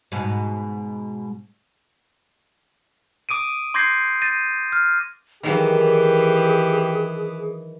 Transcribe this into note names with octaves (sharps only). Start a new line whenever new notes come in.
G#2 B2
D6 D#6 D7 D#7
C6 D6 G6 G#6 A#6 C7
G6 A6 A#6 D#7
F6
D#3 E3 F#3 G4 G#4